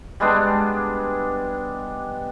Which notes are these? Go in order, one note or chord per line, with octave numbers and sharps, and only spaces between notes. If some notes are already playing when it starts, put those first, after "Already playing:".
G3 G#3 B3 D4